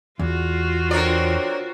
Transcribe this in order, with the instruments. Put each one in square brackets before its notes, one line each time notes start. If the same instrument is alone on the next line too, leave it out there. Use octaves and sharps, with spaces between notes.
[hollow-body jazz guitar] E2 [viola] F4 F#4
[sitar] D3 C#5 D5 [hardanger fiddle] C4 A#4